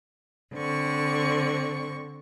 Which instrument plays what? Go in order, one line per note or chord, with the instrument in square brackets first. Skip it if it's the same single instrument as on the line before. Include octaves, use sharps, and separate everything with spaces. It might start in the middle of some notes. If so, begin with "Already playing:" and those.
[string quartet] D3 C4 C#6